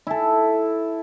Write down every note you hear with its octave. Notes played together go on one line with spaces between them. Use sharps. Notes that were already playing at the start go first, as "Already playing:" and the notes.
E4 A4